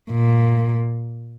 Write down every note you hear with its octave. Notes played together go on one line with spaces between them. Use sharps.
A#2